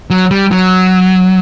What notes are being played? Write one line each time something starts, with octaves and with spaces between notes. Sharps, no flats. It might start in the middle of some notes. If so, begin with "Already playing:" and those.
F#3
G3
F#3